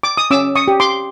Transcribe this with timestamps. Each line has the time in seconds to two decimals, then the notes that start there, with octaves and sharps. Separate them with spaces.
0.03 D6
0.17 D#6
0.31 C#4 D6 E6
0.56 C#6 D#6
0.68 G4
0.80 C6 D6